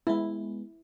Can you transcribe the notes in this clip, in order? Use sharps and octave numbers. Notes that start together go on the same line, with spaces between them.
G#3 B3 E4